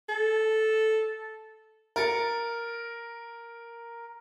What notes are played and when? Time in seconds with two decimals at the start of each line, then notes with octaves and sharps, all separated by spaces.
0.09 A4
1.96 A#4 A6 C#7